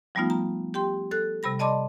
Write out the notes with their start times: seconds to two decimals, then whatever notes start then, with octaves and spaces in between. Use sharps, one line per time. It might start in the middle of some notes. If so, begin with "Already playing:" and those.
0.15 F3 G3 A3 B3 D#4 F4
0.30 A#5
0.74 G4 G5 C6
1.11 A4 F#6
1.43 C3 G3 B5 A#6
1.59 D5 D#5 A5 B5 C6 D6